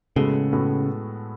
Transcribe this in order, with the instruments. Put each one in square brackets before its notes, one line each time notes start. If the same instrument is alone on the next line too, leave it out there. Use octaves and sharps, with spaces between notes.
[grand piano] A2 G#3 B3 F#4 A4 [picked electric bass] C#3
[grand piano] A2 G#3 B3 F#4 A4